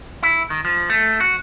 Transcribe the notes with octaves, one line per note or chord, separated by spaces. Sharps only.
E4
D#3
F3
A3
F#4